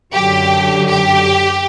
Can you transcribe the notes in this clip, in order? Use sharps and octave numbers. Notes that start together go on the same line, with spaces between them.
F#2 D3 F#3 G4
G4